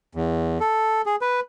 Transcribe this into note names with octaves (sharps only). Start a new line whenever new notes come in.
E2
A4
G#4
B4